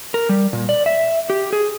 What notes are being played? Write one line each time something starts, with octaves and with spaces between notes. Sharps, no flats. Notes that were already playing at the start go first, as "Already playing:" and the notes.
A#4
G3
A#2
D5
E5
G4
G#4